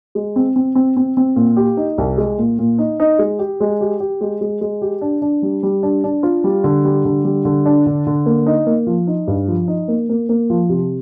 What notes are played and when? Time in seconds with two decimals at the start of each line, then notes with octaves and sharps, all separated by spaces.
0.15 G#3
0.36 C4
0.56 C4
0.75 C4
0.97 C4
1.17 C4
1.36 A#2
1.56 G4
1.77 D#4
1.98 C2
2.18 G#3
2.38 A#2
2.59 A#2
2.78 D#4
3.00 D#4
3.19 G#3
3.39 G4
3.60 G#3
3.81 G4
4.00 G4
4.21 G#3
4.41 G#3
4.61 G#3
4.82 G4
5.01 D4
5.22 D4
5.42 G3
5.63 G3
5.83 D4
6.04 D4
6.23 F4
6.44 G3
6.64 D3
6.85 G3
7.05 D3
7.24 G3
7.45 D3
7.66 D4
7.86 D3
8.07 D3
8.26 A#3
8.46 D#4
8.66 A#3
8.87 F3
9.07 D#4
9.27 G2
9.48 F3
9.68 D#4
9.88 A#3
10.09 A#3
10.29 A#3
10.50 F3
10.69 C3